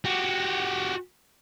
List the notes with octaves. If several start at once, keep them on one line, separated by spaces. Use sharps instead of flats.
F#4 G4